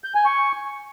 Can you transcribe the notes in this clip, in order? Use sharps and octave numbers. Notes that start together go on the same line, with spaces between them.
G6
G#5
C#6